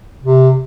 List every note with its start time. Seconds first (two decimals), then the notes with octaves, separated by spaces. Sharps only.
0.23 C3